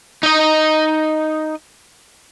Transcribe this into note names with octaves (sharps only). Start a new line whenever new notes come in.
D#4 D#5